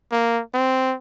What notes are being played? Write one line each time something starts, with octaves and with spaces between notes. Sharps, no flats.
A#3
C4